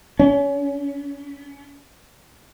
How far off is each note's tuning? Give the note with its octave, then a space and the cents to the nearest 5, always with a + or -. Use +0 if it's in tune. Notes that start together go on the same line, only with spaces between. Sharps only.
C#4 +30